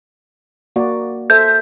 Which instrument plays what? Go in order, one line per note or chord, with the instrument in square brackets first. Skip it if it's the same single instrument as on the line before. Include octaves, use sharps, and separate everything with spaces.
[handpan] A#3 F#4 D5
[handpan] A4 C5 E5 [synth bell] G6